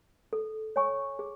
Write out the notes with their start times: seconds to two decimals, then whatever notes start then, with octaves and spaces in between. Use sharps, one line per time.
0.33 A4
0.76 C#5 G#5 C#6
1.19 G#4